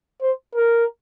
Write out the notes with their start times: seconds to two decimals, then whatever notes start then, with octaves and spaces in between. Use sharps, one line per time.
0.21 C5
0.55 A#4